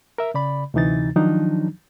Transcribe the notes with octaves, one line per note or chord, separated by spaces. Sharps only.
A#4 E5
C#3 D5 B5
D2 C3 E3 D#4 A6
D#3 F3 F#3 D4 D#4